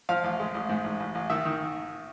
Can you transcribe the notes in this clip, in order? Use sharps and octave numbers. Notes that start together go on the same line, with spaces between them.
F3 F5
A1
G#3
A1
G#2
A1
A1
A1
D#3 E5
D#3